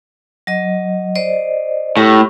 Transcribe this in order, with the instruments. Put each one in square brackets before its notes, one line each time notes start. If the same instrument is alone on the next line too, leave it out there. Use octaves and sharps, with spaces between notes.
[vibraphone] F#3 D#5
C5 D5 D#5
[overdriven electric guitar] A2 [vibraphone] G4